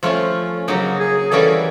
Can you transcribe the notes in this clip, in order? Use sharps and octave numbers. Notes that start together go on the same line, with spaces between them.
F3 A3 C#4 F4
C#3 F#3 A#3 D#4
G#4
E3 G3 A#3 C#4 F#4 A4